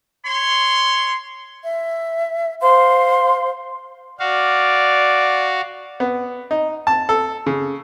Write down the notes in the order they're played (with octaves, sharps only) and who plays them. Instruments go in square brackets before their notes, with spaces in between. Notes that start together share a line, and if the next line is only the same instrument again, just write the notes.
[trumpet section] C#5 C6
[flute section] E5
C5 F5 C6
[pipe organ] F#4 F5 [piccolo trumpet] D5
[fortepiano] B3
D#4
A5
A4
C#3